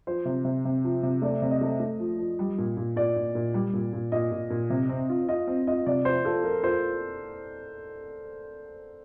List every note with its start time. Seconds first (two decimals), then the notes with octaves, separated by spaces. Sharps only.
0.07 F3 C5
0.25 C3
0.45 C3
0.65 C3
0.84 F3
1.03 C3
1.22 A3 D5
1.42 C3
1.51 D#5
1.61 A3
1.80 A3
2.00 F3
2.19 F3
2.39 G3
2.58 A#2
2.77 A#2
2.96 A#2 D5
3.16 A#2
3.35 A#2
3.54 G3
3.73 A#2
3.93 A#2
4.12 A#2 D#5
4.31 A#2
4.50 A#2
4.70 C3
4.89 C4
5.09 F4
5.28 F4 D#5
5.47 C4
5.67 F4 D#5
5.86 C3 D5
6.05 F3 C5
6.24 F4 A4
6.44 F3 A#4
6.63 F4 C5